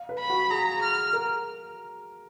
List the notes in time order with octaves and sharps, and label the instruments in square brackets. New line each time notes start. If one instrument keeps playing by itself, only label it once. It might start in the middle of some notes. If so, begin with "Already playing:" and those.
Already playing: [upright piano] F5
B4
[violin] B5
[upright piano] F#4
[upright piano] G#4 [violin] A#5
[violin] F6
[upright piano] A#4